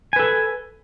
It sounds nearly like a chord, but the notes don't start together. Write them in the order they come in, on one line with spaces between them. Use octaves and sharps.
G#5 B4 A4